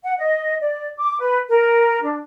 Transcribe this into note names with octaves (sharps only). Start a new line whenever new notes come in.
F#5
D#5
D5
D6
B4
A#4
D4